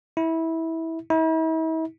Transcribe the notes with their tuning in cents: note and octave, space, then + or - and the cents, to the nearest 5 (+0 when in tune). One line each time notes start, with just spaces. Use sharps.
E4 -20
E4 -45